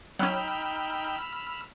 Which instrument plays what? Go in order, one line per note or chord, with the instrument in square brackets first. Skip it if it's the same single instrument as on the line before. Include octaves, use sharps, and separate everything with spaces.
[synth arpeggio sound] F#3 C#4 [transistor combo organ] D#4 G5 [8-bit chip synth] B5 E6 F6